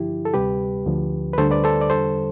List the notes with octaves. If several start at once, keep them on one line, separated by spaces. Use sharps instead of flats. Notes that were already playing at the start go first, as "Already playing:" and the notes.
Already playing: G2 D3 F3 E4 G4
A4
D2 C3 G3 G4 B4
D2 D3 F3
B4
D2 D3 G3 A4 C5
B4 D5
A4 C5
D5
E2 D3 G3 A4 C5